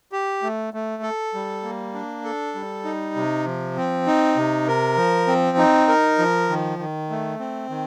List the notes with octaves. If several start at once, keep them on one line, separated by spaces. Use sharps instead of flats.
G4
A3
A3
A4
G3
A#3
D4
A4
G3
D#4
C3
F3
C4
D#4
C3
A#4
F3
C4
D#4
A#4
F3
D#3
D#3
A3
C4
D#3